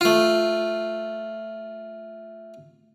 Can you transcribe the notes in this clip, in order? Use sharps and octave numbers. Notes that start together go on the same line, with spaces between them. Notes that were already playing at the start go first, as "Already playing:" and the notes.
A3 F4